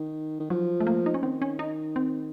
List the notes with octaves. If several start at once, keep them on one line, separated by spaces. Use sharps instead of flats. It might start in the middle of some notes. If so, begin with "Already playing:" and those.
Already playing: D#3
D#3
F3 F#3
A3
A#3
D#4
C#4
D#3 C4
C#4
D#4
C4